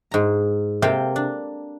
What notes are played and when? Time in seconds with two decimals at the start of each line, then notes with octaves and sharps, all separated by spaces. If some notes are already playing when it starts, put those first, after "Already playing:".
0.11 G#2 A#5
0.82 C3 A#3 A4 F5 G5
1.16 D4